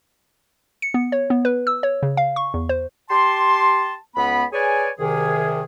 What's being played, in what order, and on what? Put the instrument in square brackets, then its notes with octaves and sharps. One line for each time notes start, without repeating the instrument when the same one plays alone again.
[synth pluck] C#7
B3
C#5
B3
B4
E6
C#5
C#3
F5
C#6
E2
C5
[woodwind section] G4 A5 C6
C#2 B3 B5
G#4 B4 C#5 D5 G#5
C2 C3 D#3 G#4